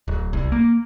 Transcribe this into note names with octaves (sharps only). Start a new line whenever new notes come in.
D1
C2
A#3